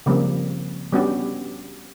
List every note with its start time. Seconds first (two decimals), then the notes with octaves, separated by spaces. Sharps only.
0.06 C#3 F3 G3 A#3 C4
0.93 G3 B3 C#4 D4 F#4 G4